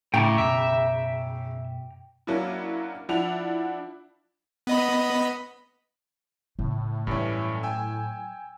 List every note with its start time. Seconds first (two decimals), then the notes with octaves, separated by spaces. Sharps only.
0.14 A2 C#3 G5 A#5 D6
0.38 F#2 B2 E5
2.27 F#3 A#3 C#4 D4 E4
3.09 F3 D4 E4 F#5 F7
4.67 B3 D#5 B5
6.59 A2 C#3
7.07 G2 E3 F#3 C#4
7.63 G5 G#5 E6